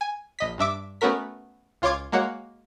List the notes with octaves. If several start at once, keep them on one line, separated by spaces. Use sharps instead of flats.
G#5
A#1 D#5 B6
G2 D4 E5 D6
A3 B3 C#4 F#4 A#4 B6
C#2 F4 C#5 C6 D6 G#6
G#3 A#3 F#4 C#5